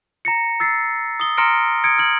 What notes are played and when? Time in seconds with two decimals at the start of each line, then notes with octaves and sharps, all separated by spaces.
0.25 A#5 A#6 C#7
0.60 E6 A6 C7
1.20 D#6 G7
1.37 A#5 C6 F6 A#6 C#7 D7
1.84 D#6 G#6 C#7 D7
1.98 F6 G#6 F#7